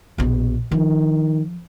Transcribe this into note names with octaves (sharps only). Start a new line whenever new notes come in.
A#1 B2
D#3 F3